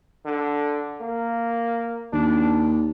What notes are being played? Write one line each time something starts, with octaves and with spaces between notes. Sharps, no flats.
D3
A#3
D#2 D4